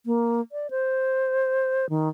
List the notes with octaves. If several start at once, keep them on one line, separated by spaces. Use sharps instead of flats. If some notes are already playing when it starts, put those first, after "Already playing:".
A#3
D5
C5
D#3